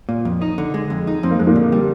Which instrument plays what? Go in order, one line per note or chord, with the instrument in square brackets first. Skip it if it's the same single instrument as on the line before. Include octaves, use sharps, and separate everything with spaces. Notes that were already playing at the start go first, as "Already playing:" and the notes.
[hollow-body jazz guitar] A#2
F2
D#4
D3
G#3
F2
D#4
[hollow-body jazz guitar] F2 [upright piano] C4
[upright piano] A#3
[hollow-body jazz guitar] F2 [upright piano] G#3
[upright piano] A#2 A#3
[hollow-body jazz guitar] D3
G3